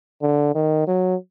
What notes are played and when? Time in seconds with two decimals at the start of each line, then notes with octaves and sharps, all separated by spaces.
0.22 D3
0.55 D#3
0.87 F#3